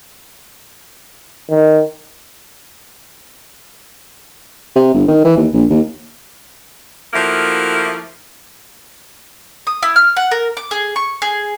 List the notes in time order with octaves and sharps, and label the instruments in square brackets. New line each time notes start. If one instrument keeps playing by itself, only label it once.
[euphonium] D#3
[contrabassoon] C3
G1
D#3
E3
D#2
A#1
D#2
[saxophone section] F3 A3 A#3 E4 F#4
[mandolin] D#6
E4
F6
F#5
A#4
D6
G#4
C#6
G#4